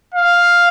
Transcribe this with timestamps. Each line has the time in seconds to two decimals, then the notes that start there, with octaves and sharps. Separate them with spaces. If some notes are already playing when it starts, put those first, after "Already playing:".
0.14 F5